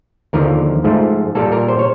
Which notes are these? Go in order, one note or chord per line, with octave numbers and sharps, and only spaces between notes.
D#2 D3 F3 A#4
G#2 F3 A3
A#2 G3 A#3 A4
A#4
C5
C#5